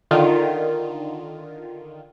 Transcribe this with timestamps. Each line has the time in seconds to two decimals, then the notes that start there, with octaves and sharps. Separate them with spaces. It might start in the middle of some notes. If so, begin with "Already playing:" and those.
0.11 D3 D#3 F4